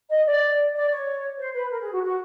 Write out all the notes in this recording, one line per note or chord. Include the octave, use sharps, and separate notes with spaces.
D#5
D5
D5
C#5
C5
B4
A#4
G#4
F#4
F#4